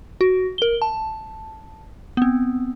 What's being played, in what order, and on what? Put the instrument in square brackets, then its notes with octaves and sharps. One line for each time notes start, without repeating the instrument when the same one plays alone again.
[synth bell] F#4
A#4 G7
A5
B3 C4